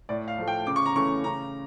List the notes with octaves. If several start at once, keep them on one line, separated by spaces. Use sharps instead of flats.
A2 D5
F5
F3 A3
G5
C#3 D6
C#6
A#5
E3 A3 C#4 C#6
C#3 A#5